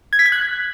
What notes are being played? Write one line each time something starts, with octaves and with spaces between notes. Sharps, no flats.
G#6
B6
G#6
F#6